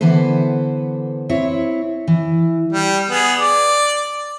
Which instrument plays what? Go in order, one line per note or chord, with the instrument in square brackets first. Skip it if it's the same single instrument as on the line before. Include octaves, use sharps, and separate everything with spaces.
[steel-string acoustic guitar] D3 E3 B3 A4 B4 C5
C4 E4 C#5
E3
[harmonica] G3
B3 G#4
D5